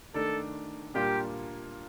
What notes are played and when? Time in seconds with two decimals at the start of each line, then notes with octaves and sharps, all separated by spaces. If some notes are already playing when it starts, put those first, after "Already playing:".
0.14 D#3 A3 D4 A4
0.95 A#2 G3 A#3 D4 F4 G4